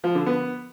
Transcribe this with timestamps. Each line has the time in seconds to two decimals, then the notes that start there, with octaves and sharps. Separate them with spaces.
0.04 F3
0.15 D3
0.26 B3